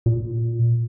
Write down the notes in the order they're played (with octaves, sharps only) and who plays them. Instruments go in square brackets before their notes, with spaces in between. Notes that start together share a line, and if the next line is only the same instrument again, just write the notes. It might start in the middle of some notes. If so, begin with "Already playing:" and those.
[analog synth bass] A#2